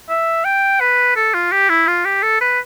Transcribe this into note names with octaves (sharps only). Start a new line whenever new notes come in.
E5
G5
B4
A4
F4
G4
E4
F4
G4
A4
B4